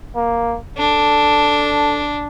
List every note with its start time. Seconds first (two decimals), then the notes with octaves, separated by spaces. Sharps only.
0.16 A#3
0.77 D4 A4